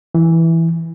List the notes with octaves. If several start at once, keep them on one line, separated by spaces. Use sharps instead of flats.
E3